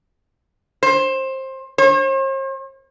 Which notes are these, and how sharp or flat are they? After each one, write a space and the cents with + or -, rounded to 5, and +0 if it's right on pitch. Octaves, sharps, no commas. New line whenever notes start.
C5 +20
C5 +45